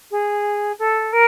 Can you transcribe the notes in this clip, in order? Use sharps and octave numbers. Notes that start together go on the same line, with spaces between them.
G#4
A4
A#4